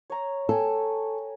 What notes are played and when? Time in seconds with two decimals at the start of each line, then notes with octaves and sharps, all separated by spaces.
0.10 C#5 A#5
0.49 A4 G5 G#5